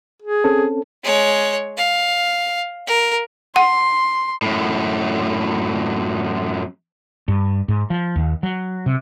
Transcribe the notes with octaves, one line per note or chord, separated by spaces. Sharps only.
G#4
C4 C#4 A4
G#3 C#5
F5
A#4
F#5 C6
F#2 A2
G2
G#2
F3
D#2
F#3
C3